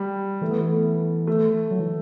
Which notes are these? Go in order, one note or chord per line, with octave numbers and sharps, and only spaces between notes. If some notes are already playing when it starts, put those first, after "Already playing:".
Already playing: G3
E3 A3
B3
A3
A3
F#3
E3